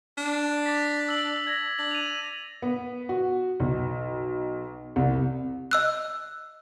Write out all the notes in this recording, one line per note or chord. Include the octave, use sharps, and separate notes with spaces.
D4
D6 A6 B6
E6 F#7
G#6 A#6
D4 F#7
D#7 F7
B3
F#4
B1
C2
D#5 E6 F#6